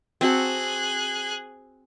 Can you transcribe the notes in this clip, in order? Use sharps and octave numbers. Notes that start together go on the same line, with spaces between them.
C4 F#4 G#4 A5 F#6